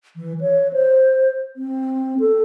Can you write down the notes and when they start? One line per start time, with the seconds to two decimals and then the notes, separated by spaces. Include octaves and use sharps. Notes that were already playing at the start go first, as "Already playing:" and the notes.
0.16 E3
0.41 C#5
0.73 C5
1.56 C4
2.20 A4